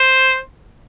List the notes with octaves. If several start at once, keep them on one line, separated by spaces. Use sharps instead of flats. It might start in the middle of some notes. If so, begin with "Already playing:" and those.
Already playing: C5